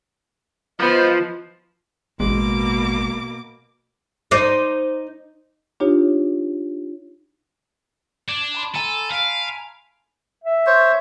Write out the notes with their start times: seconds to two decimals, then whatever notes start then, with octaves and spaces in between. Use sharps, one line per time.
0.80 F3 B3 C5 D#5
2.20 A1 B2 G#3 A#3 D6
4.31 D#4 C5 D5
5.80 D4 D#4 F4 G4 C#5
8.28 D4 G#6
8.54 A5 B5 C6
8.75 A4 G#5 A#5 D#7
9.12 F5 B6 D7
10.44 E5
10.66 C5 C#5